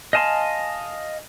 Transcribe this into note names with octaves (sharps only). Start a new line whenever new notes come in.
D#5 F5 G#5 A5 C6